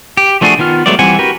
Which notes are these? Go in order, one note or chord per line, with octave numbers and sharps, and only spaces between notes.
G4
F3 A3 D4 F#4 G#4
D#3 B3 F4 F6
F#3 G#3 A3 B3 D5
E3 G3 C4 F#5 G#5
F#4 G4 A#4 B4